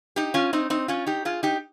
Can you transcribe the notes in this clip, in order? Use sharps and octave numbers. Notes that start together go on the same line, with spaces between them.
D#4 G4
C#4 F4
C4 D#4
C4 D#4
C#4 F4
D#4 G4
F4 G#4
D#4 G4